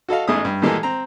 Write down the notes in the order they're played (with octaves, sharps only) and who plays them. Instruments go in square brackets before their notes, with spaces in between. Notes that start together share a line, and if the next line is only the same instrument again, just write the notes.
[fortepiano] F#4 A4 D#5 F5
A1 G#2 G#3 E5 D#6
G2
A#2 E3 G#3 A#3 G4 A4
C4 A#5